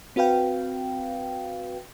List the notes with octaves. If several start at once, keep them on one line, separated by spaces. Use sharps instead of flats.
C4 F#4 B4 F5 G5